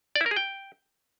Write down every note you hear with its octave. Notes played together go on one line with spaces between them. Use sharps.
D5
E4
A#4
G#4
G5